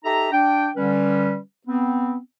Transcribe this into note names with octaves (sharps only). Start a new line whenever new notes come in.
D#4 G4 A4 E5 A#5
D4 G5
D3 G3 C#4 B4
B3 C4